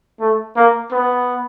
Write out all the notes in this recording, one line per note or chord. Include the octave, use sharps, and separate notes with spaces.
A3
A#3
B3